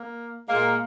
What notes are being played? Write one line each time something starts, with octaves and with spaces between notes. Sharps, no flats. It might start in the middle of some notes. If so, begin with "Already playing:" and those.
Already playing: A#3
A#2 G#3 A#3